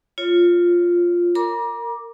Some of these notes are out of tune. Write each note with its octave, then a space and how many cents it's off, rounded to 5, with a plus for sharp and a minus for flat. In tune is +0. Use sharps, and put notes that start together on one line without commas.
F4 +0 C#5 +0
A#4 -25 A#5 +35 D6 +0